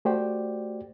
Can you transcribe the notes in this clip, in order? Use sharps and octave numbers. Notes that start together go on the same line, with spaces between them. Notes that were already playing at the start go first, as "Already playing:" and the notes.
A3 F#4 G4 C5 D5 G5